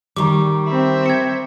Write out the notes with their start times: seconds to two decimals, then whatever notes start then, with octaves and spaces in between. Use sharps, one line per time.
0.16 D#3 G3 A#5 C#6 D6
0.67 C4 E5 B5
1.06 G#6 C#7